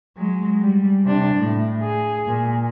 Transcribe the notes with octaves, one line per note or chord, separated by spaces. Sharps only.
F#3 G#3
G3
C3 D4
A2
G#4
A#2